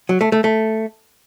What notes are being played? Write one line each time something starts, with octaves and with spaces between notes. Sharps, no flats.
F#3
A3
A3
A3